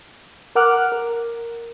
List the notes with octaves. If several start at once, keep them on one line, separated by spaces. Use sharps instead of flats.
A#4 F#5 D6 F6 F#6
A#4